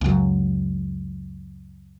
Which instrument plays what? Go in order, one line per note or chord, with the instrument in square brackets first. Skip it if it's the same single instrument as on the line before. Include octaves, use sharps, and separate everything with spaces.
[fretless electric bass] C#2 F#2